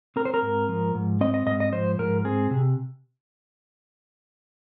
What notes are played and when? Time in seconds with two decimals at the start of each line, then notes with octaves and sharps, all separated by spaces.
0.16 C4 A#4
0.25 C5
0.34 A#4
0.42 G#2
0.69 F3
0.95 G#2
1.21 C4 D#5
1.34 D#5
1.46 G#2 D#5
1.60 D#5
1.72 F3 C5
1.99 G#2 A#4
2.25 C4 G#4
2.51 C3